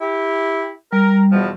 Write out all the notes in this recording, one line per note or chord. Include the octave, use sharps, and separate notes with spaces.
E4 G4
G3 A#4
E2 B2 F3